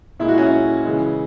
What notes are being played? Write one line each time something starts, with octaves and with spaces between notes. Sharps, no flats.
A#2 G#3 E4
F#4
C#4 E4
C#3 E3 G#3